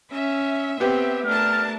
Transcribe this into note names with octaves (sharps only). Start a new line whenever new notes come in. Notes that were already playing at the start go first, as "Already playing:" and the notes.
C#4 E5
B3 C4 G4
A3 D4 A#4 A5 F6